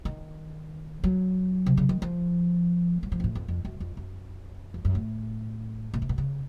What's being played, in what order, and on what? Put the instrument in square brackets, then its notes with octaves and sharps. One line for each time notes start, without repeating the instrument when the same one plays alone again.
[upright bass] D#3
F#3
C3
C#3
D#3
F3
F#3
F3
F#2
A2
F2
F2
F#2
F2
F#2
F2
F#2
A2
A#2
C3
A#2
C#3